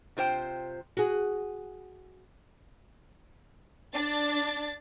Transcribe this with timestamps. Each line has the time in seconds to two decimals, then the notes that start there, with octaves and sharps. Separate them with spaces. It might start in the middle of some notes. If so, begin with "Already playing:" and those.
0.17 C3 F4 C5 G5
0.97 F#4 G#4
3.93 D4 A6